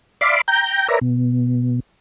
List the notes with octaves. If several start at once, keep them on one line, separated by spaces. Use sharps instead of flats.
D5 E5 F5 B5 C6 D6
G5 A#5 G6
A#4 B4 C#5 D5 E5 A#5
B2